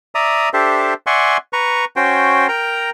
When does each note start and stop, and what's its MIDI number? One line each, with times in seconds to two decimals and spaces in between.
0.15 0.49 74
0.15 0.49 76
0.15 0.49 82
0.15 0.49 87
0.53 0.94 62
0.53 0.94 67
0.53 0.94 69
0.53 0.94 72
0.53 0.94 76
1.07 1.37 74
1.07 1.37 76
1.07 1.37 78
1.07 1.37 80
1.07 1.37 84
1.07 1.37 85
1.53 1.85 71
1.53 1.85 82
1.53 1.85 85
1.96 2.47 61
1.96 2.47 66
1.96 2.47 72
1.96 2.47 79
2.49 2.90 70
2.49 2.90 79
2.49 2.90 82